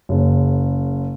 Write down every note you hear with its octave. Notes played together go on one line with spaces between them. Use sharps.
F#1 F#2 C#3